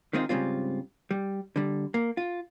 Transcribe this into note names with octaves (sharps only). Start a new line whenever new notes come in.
D#3 G#3 C4 D#4 F4
G#2 C#3 G3 C4 F4
G3
D3 G3
A#3
F4